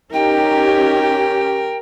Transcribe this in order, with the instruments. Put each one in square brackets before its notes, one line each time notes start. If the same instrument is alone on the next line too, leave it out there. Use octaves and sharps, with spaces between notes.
[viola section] C#4 G4 [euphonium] D#4 [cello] A#4 [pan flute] G5